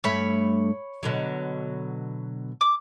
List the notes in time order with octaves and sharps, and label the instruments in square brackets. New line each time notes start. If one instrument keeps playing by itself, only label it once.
[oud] G2 A3 [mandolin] C#5 B5
[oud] B2 D3 F#3
[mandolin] D6